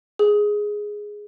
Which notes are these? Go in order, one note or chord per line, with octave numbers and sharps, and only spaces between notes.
G#4